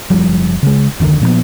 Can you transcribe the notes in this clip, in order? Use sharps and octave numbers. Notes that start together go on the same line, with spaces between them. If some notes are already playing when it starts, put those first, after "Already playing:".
F#1 F3 G3
C#3 G#3
F1 D2 D3 D#3
A#2 F3 F#3 B3